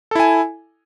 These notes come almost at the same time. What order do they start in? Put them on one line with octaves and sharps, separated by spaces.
A4 E4 G#5